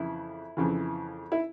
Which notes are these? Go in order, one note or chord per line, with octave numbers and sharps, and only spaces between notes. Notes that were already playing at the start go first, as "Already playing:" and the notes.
Already playing: F2 C#3 E3 E4
F2 C#3 E3
E4